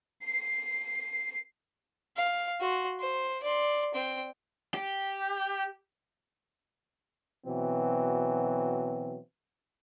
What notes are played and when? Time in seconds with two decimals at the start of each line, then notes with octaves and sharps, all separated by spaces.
0.23 C7
2.17 F5
2.60 F#4 C6
3.00 C5
3.43 D5 C6
3.94 C4 G5
4.74 G4
7.46 B2 E3 F#3 C4